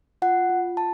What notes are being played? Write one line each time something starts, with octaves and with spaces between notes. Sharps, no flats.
F4 F#5
F4
F4 A5